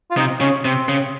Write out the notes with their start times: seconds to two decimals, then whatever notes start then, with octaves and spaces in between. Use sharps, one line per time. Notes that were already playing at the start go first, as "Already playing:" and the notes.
0.11 F4
0.17 C3 D#4
0.40 C#3 C#4
0.65 C3 C4
0.89 C#3